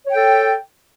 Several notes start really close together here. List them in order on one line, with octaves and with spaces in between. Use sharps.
C#5 G5 A4